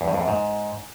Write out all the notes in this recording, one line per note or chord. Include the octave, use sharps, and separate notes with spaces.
E2
G2
F2
F#2
G#2